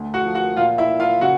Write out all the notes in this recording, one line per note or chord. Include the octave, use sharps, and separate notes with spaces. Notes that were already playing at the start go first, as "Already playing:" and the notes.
Already playing: D2 A3
F#4 F#5
F3
F#4 F#5
A#2 F4 F5
E4 E5
A#2
F4 F5
C#3 F#4 F#5